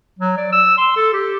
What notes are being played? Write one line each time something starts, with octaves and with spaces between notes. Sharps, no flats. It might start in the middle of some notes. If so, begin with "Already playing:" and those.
F#3
D5
E6
C6
A4
G4